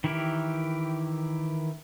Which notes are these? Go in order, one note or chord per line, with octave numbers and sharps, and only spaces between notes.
D#3 E3 E4 G4 A#4